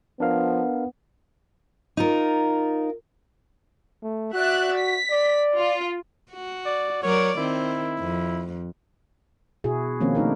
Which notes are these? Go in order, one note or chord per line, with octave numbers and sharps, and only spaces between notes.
F3 B3 D4 A#4 F5
D#4 F4 A#4
A3
F#4 D5 E5 F#6
B6
D5
F4
F#4
D5
F#3 A#4 C#5 D5
D#3 C4 E4
F2
B2 E4 F#4 G#4
D#3 F3 A#3 C4 C#4
A3 D4 D#4 A#4